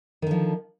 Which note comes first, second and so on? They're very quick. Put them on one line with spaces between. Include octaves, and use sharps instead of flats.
D#3 D3 F3